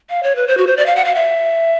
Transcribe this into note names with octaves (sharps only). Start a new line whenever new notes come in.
F5
C#5
B4
C5
F#4
C5
D5
F5
F#5
F5
E5